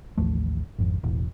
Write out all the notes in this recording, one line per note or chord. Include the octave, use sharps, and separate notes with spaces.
A1 D#2 F3 A3
G#1 F2
E1 A1 E3